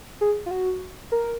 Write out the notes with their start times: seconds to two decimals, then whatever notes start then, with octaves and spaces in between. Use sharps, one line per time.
0.21 G#4
0.46 F4
0.51 F#4
1.12 A#4